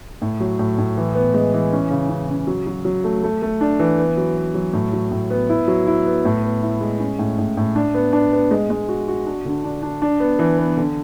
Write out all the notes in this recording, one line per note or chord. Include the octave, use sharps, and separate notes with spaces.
A2
F#3
A2
A2
E3
B3
G#3
E3
C#4
C#3
C#4
C#3
F#3
F#3
F#3
A3
A3
A3
D4
E3
B3
F#3
B3
F#3
A2
F#3
A2
B3
E4
F#3
E4
B3
A2
B3
E4
G#3
C#4
A2
A2
A2
D4
B3
D4
B3
G#3
G#3
F#4
F#4
D4
D3
D4
D4
D4
B3
E3
B3
D3